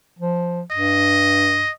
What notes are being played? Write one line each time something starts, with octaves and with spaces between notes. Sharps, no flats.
F3
G2 D#5